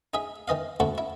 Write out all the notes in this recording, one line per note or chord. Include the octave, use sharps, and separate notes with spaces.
D#4 G#4 E5
D#3 E3 D#5 F5
D2 E4 F#4 A4 C#6
E4